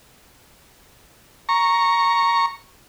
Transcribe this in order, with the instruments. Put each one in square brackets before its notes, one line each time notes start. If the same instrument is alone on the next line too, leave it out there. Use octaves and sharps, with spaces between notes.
[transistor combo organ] A#5 C#6